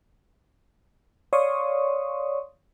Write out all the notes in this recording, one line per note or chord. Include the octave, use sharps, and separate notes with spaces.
C#5 D5 F5 C6 C#6 D#6